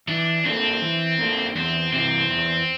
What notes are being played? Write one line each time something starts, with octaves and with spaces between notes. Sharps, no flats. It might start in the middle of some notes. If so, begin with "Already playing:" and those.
E3 D4
A#3 C4 D4 A4
E3
A#3 D4 A4
E2 C4
C3 E3 C4
E2